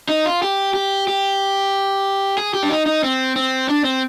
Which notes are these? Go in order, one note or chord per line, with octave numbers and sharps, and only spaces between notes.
D#4
F4
G4
G4
G4
G#4
G4
D4
D#4
D#4
C4
C4
D4
C4